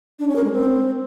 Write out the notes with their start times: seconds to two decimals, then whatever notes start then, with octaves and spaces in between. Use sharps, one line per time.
0.19 D4
0.27 C#4
0.36 A#4
0.44 G#3
0.52 C4